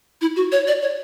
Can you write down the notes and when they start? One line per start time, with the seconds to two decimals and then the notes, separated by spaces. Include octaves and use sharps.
0.21 E4
0.36 F#4
0.52 C#5
0.67 D5
0.82 C#5